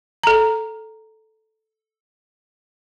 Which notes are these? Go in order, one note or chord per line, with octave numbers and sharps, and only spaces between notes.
A4 A#5